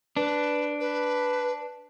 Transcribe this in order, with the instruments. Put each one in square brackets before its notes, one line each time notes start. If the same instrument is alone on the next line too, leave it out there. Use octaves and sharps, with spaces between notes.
[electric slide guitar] D4 [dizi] B4
[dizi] B4